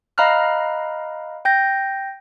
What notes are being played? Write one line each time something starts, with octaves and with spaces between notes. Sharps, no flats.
D#5 F5 A#5 B5 F6 F#6
G5 G6 A#6